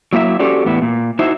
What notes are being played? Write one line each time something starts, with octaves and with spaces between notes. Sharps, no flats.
F#3 A#3 E4 E5
C#4 F#4 G4 A4 C5 D5
E2 A2 B3 E4
A#2
D#4 E4 F#4 C5 E5